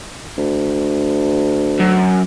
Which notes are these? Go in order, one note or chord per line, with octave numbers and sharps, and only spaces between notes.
D2
F#2